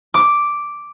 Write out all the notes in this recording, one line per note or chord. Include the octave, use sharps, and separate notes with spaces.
D6